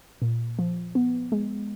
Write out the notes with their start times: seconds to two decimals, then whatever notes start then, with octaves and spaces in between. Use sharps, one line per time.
0.22 A#2
0.59 F3
0.95 B3
1.32 G#3